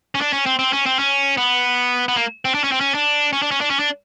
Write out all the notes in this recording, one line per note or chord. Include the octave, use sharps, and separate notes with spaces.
C#4
D4
C#4
C4
C4
C#4
C4
C#4
B3
B3
A#3
C4
D4
C#4
C4
C#4
D4
C#4
D4
C#4
D4
C#4
D4